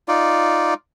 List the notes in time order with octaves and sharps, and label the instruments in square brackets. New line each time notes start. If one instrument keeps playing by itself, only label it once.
[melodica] D#4 F4 D5